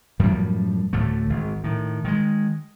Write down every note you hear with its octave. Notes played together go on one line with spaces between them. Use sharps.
F#2 A2 F3 G3
D2 A2 D3 A3
G#1
A2 D#3
D#3 E3 G#3